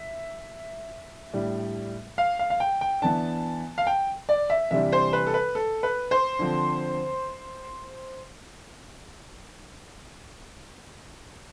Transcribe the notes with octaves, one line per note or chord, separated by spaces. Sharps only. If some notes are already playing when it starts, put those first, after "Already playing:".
Already playing: E5
A2 G3 D4
F5
F5
F5
G5
G5
E3 B3 D4 A5
F5
G5
D5
E5
C3 E3 G3 D4 E5
C5
B4
A4
B4
A4
B4
C5
D3 F3 C4